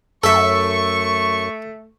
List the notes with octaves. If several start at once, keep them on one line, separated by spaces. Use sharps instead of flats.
F#2 A3 A4 E5 C#6